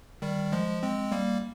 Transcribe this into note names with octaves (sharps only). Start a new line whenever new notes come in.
D#3 G3
F3 G#3
G#3 C4
G3 A#3